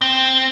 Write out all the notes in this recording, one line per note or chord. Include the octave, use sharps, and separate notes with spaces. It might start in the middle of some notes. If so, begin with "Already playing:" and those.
C4